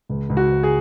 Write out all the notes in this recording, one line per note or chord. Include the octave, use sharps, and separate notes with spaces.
C#2
C#2
F#4
C#2
G#4